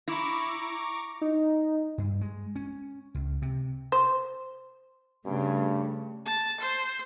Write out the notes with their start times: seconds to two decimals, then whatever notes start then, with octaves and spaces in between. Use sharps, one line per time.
0.08 E4 A#5 C#6 D6
1.21 D#4
1.98 G2
2.21 G#3
2.56 C#4
3.14 C#2
3.42 C3
3.92 C5
5.26 G2 C#3 A3
6.26 A5
6.61 C5